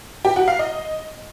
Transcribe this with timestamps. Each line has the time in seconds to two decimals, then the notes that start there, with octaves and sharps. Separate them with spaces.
0.25 G4
0.36 F#4
0.48 F5
0.59 D#5